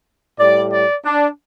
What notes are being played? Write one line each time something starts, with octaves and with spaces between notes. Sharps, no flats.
A2 G3 D5
D5
D4